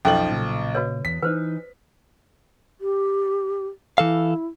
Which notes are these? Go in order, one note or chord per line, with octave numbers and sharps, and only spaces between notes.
B1 F2 F3 C#4 D#4 A4 F#7
A#2 C#3
F#4 B4 C#5
E2 B6
E3 D#4 B4 C5
G4
E3 E4 A4 F5